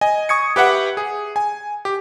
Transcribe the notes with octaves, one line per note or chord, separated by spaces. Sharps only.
D#5 G#5
C#6 D#6 G#6 C#7
G4 B4 E5 F#5 G5
G#4
G#5
G4